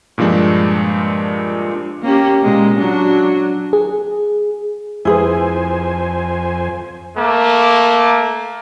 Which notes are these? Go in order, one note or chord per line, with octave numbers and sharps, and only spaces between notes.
G2 A#2 F3 G#3 D4
A#3 C#4 G4
A#2 G#3
F#3 D4 F#4
G#4
F2 E4 G#4 B4 C5 G#5
A3 A#3